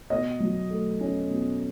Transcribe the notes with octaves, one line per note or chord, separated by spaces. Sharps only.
B2 D#5
F#3
A3
C#4
B2